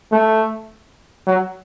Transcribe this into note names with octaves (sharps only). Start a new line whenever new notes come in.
A3
F#3